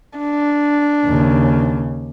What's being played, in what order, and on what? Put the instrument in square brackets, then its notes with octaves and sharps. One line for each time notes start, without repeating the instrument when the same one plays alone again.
[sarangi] D4
[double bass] D#2 C#3